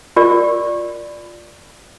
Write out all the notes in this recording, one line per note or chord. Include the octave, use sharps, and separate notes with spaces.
F4 G4 A#4 D5